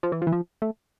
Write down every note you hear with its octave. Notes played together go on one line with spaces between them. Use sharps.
F3
E3
F3
E3
F3
A3